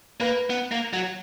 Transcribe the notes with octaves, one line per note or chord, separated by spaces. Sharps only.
A#3 B4
B3
A#3
F#3